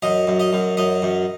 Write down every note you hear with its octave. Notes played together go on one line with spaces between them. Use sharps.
F#2 D#5
F#2
D#5
F#2
F#2 D#5
F#2